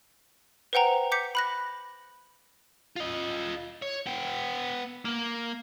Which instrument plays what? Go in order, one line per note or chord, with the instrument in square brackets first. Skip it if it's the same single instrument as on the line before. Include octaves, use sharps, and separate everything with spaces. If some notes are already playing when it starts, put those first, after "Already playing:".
[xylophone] B4 C5 F#5 G5 A#5
D6 G6 B6 C#7
B5 F#6 A#6
[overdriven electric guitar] F4 D#5
C#5
B3 G5
A#3